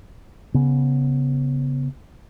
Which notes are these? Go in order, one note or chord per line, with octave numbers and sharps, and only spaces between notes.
C#3 B3